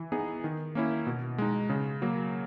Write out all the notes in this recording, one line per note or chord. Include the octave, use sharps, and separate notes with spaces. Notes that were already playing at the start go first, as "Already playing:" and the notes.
Already playing: E3
B3 D#4 G#4
D#3
A#3 C#4 E4
B2
G#3 D#4
C#3
F#3 A#3